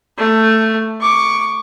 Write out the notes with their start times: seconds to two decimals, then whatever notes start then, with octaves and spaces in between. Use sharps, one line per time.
0.18 A3
1.01 C#6 D6